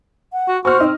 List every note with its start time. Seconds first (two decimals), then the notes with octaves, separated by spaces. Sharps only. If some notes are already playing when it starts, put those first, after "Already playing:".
0.33 F#5
0.48 F#4
0.65 F#4 C5 C#6 F6
0.80 C4 D#4